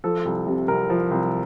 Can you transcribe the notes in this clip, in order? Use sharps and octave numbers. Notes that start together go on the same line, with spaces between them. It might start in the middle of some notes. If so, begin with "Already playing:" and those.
F3 A4
C2
C3
C2 A#4
F3
C2